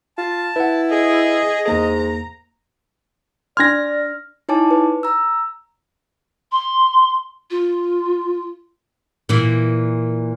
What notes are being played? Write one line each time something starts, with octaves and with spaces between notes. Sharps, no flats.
F4 A5
E4 B4 F#5
G#4 D#5
E2 G#2 A#3 A#5
D4 D5 C6 F6 G#6 A#6
D#4 E4 C#5 G#5 A5 D6
B4
A#5 E6
C6
F4
A#2 E3